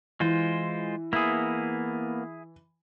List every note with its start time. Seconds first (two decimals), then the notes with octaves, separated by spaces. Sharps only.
0.20 E3 G#3 F4 C5
1.13 A#3 B3 E4 G#4